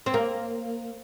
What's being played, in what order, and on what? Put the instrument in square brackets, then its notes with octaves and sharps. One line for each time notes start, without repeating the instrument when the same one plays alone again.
[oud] C4
A#3